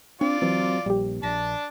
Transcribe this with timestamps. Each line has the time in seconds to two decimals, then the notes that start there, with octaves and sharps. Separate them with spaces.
0.21 C4 D4 F4 D5
0.42 E3 F#3 C4
0.86 A#1 G3 G4
1.23 A#1 D4 A5 A#6 B6